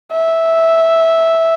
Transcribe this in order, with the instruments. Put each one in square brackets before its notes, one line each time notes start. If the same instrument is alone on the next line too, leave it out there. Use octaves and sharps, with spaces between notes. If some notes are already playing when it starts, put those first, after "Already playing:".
[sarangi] E5